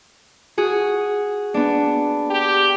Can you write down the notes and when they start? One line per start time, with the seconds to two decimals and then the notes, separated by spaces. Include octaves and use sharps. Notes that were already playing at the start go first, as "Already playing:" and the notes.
0.58 F#4 G#4
1.54 B3 D4
2.31 G4